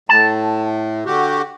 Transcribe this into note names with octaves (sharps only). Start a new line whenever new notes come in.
A2 A5
D3 F#4 G4